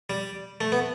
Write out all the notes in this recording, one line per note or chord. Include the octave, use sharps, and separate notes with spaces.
G3
A3
B3